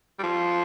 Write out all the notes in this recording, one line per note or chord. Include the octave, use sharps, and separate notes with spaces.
G3
F3